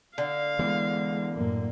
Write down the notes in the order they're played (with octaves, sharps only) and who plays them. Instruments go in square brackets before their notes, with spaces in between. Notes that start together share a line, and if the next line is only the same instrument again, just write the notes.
[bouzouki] D3 [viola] F5
[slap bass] E3 B3 [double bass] G#3
[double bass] F#2 A2 [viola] A#3